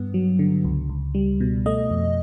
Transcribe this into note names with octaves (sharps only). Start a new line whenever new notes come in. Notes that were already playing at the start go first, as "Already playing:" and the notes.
Already playing: G2 B3
F#3
D3
C#2
C#2
G3
B2
A3 D#5
F2